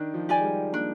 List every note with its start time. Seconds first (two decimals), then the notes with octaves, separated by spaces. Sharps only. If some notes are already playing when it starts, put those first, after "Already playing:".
Already playing: D#3 D4
0.14 F3
0.29 G4 D5 G#5
0.39 G#3
0.44 G3
0.73 A#3 D4